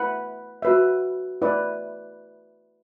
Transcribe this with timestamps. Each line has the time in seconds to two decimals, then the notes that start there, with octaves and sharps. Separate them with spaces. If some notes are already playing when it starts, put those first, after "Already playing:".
Already playing: E4 B4 F#5 B5
0.62 F#4 B4 E5
1.42 E4 B4 D5